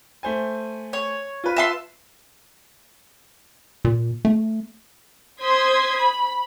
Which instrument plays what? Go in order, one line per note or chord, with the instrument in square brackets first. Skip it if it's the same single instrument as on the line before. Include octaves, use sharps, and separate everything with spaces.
[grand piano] A3 C5 G#5
[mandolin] C#5
[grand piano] F4 B4
[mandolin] E5 A5 C6
[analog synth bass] A#2
A3
[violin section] C5 C6 D#6 G#6 B6
B5